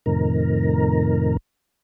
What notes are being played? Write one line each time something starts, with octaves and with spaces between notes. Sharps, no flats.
F2 A2 C3 D#3 A#4